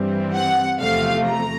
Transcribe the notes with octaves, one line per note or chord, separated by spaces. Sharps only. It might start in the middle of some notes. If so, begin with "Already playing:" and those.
Already playing: G2 E3 G3 C4
F#5
E2 C3 F3 A3 F5
A#5